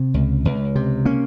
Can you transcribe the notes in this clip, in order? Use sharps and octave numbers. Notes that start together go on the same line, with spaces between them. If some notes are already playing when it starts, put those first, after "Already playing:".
Already playing: C3
C#2
C#2
C3
A#3 C#4